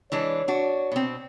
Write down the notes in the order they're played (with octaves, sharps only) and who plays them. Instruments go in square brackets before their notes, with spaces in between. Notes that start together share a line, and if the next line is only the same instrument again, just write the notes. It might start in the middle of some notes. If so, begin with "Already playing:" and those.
[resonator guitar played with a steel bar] E3 G#3 D4 [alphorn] C#5
[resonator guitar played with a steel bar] D4 F#4
B2 C4